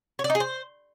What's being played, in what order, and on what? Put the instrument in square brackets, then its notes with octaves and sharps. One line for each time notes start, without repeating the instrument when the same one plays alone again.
[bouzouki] C#5
D5
D#4
G#4
C5